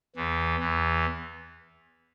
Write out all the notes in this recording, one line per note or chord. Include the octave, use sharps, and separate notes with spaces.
E2 E3
E2 E3